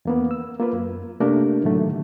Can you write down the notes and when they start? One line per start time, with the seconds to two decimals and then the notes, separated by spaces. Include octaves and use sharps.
0.05 E2 A#3 B3
0.31 E6
0.60 A#3 F4 B4
0.73 F#2
1.20 C3 A3 A#3 D4 G4 A#4
1.64 A2 D3 D#3 F#3 A3